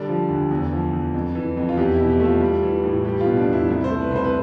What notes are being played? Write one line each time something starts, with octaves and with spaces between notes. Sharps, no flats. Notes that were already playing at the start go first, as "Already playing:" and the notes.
Already playing: D3 G3 D5
F3
D2
E2
F3
E2
F2
E3
F2
F4
E2 G4
E4
B2
G4
A3
F4
G3
E3
A2
G3 G4
F4
B2
D4
E2
E4
C2 E4
C5
A3
B4
C2 C5
B4